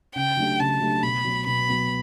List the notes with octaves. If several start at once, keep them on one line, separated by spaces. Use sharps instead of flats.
C#3 G5
F#3 A3 D4 G4
C#3 A5
F#3 A3 D4 G4
B2 B5
F#3 B3
B2 B5
F#3 B3